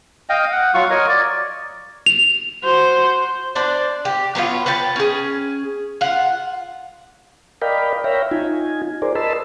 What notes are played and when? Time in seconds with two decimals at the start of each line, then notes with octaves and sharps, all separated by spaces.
0.29 D#5 F5 G5
0.52 F#5
0.74 F#3 F4 F5 C#6
0.90 A#4 C#5 D#5
1.09 D5
2.06 F7
2.64 F#4 C5
3.55 D4 C5 D5
4.05 G4
4.35 F#3 B3 C#4 F4
4.66 B4 C#5 G5 A5
4.96 C#4 G#4
6.01 F4 F#5
7.62 A#4 D5 D#5 F5 G5 B5
8.04 C#5 E5 F5 G5 A#5 B5
8.31 D#4 F4 G#5
9.02 G#4 A#4 C5 D5
9.15 A#4 D#5 A5 B5 C6 E6